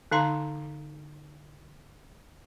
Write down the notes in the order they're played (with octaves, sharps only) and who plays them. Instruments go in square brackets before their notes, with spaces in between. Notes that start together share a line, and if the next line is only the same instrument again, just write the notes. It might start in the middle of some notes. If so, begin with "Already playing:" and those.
[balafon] D3 D#4 F5 A#5 C6